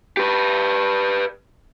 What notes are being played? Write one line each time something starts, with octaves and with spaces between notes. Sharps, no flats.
G4 B4